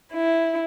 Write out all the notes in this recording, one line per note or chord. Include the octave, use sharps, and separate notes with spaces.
E4